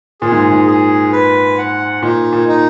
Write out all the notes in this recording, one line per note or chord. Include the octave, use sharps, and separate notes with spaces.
A#2 G#4
G#2
G#2
G#4
B4
F#5
A#2 D#4
A#2
D#4